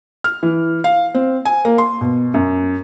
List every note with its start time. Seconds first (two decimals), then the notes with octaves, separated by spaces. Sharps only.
0.24 F6
0.43 E3
0.84 F5
1.14 C4
1.45 G#5
1.65 A#3
1.78 C6
2.01 B2
2.34 F#2